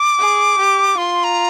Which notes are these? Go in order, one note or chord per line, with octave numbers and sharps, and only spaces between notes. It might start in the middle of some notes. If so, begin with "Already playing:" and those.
Already playing: D6
G#4
G4
F4 C6
A#5